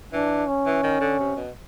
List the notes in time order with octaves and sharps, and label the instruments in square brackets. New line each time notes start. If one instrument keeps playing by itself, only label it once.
[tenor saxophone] E3 [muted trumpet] D4
[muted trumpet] C#4
[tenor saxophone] E3
D#3
D3
C3
B2